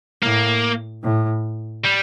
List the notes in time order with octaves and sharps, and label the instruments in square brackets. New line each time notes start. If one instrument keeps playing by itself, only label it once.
[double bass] A2 [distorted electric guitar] A#3
[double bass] A2
[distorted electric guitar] G3